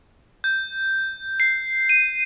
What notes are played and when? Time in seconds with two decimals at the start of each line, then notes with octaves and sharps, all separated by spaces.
0.44 G6
1.40 C7
1.89 D#7